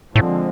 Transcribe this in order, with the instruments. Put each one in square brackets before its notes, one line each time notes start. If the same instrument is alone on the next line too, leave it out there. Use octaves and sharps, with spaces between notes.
[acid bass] A2 [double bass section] D3 F3 G#3 C4